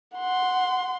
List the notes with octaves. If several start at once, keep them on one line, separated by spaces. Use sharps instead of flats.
F#5 C6